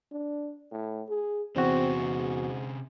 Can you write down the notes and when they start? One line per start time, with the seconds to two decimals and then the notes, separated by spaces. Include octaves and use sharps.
0.11 D4
0.72 A2
1.09 G#4
1.56 E2 C3 C4 C#4 F#4
1.98 G#2